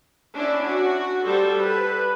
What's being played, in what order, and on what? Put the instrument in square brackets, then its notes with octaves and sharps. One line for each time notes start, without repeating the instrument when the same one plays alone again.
[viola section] C#4 D4 E4
F#4
G3 A4 C5
B4